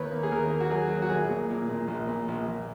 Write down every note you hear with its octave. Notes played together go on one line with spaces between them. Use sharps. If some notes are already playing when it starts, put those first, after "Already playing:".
Already playing: D#2 D#3 A#3 B4 C#5
A#3
G#4
D#2 A#4
A#3
F#4
F#3 G#4
F#3
F#4
A#1 G#4
A#2
A#2
A#2
A#1
A#2
A#1
A#1